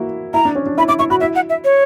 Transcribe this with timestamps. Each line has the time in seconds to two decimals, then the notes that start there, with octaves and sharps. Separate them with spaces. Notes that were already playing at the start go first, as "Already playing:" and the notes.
Already playing: A#3 E4 F#4
0.34 E4 A#5
0.45 D4
0.55 C#4
0.66 D4
0.78 E4 B5
0.88 E4 D6
0.99 E4 C#6
1.10 F#4 B5
1.20 E4 E5
1.35 F#5
1.50 E5
1.64 C#5